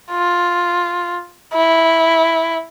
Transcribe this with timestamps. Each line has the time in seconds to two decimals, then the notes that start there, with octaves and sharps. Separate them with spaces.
0.11 F4
1.54 E4